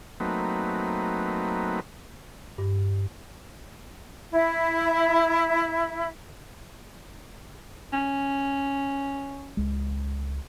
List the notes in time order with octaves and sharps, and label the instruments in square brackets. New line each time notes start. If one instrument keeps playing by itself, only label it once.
[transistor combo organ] F#3 A3 A#3 C4 D#4 B4
[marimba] G2
[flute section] E4 E5
[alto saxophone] C#4
[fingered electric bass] C#2 G#3